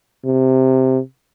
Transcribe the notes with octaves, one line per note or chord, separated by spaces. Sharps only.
C3